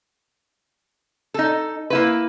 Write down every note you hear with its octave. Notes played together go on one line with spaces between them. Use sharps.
D#4 A4
A#3 E4 B4